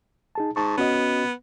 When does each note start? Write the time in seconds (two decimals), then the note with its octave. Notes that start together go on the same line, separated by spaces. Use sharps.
0.35 D#4 G#4 A5
0.56 G#2 A5 C#6
0.78 B3 C#4 F#4 D#5